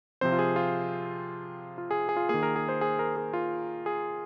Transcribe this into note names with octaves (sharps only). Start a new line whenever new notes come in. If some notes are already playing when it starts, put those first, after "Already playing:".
C3 F3 C4 C5
F4
G#4
F4
F4
G#4
G#4
F4
D#3 A#3 G#4
A#4
G#4
C5
G#4
A#4
G#4
F4
G#4